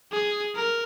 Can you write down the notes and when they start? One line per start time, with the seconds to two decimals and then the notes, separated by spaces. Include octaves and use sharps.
0.12 G#4
0.56 A#4